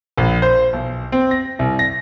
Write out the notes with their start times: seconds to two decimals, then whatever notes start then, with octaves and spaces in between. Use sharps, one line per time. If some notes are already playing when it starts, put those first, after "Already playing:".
0.18 A#1
0.42 C5
0.73 B1
1.12 C4
1.31 A#6
1.59 C2
1.79 A#6